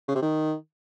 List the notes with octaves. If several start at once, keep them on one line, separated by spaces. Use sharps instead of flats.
C#3
C3
D#3